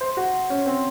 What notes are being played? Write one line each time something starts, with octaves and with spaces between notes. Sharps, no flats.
C5
F#4
C#4
C4